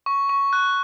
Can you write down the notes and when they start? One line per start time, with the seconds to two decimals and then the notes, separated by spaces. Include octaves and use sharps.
0.06 C#6
0.29 C#6
0.53 F#6